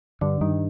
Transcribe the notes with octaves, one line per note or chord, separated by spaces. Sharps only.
G2 D3
G2 D#3